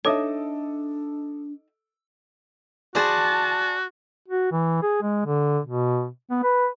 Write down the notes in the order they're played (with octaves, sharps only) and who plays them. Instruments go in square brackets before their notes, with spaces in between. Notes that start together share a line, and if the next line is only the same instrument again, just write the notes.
[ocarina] D4 [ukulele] D#4 D#5 E5 [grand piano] A4 D6 D#6 [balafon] C#5
[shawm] F#4 [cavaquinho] G#4 C5 D5 [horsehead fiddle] A5
[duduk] F#4
E3
G#4
G#3
D3
B2
B3
B4